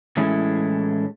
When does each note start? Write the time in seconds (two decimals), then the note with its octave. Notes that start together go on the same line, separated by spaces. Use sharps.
0.17 A2 E3 G#3 A3 C#4 E4